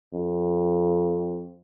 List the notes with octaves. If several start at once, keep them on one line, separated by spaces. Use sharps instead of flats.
F2